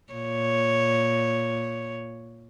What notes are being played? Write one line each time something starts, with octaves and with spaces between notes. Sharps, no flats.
A#2 C#5